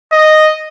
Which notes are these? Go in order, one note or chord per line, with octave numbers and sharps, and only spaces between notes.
D#5